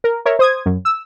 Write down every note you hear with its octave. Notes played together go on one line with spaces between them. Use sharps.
A#4
A#4 C#5 E5
C5 D#6 G#6
F#2
E6